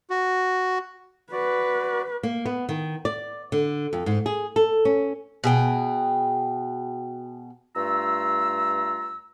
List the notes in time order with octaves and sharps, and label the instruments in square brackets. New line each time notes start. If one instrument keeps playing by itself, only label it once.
[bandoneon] F#4
[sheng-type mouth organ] F#4 D5 [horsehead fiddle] B4
[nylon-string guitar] A#3
B3
D#3
D5
D3
F2
G#2
G#4
A4
C#4
[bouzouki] B2 G#4 G5
[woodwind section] G2 A3 F4 A#5 E6